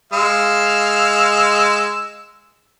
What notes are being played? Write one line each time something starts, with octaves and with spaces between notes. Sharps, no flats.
G#3 F5 E6